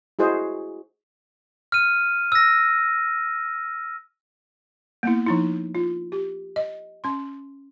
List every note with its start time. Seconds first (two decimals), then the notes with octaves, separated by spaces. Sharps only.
0.19 E4 F#4 G#4 C5 D#5
1.72 F6 D#7
2.32 E6 A#6
5.03 A#3 B3 E4
5.26 F3 D#4 E4
5.75 F4
6.12 G4
6.56 D#5
7.04 C#4 C6